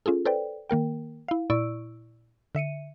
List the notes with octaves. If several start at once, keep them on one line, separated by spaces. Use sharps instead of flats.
C#4 F4 G#4 A4
A4 B4 C5 D5 G5
D#3 A#3 A#4 G5
E4 F5
A#2 E4 D5 C#6 E6 D7
D3 E5 C#7 D#7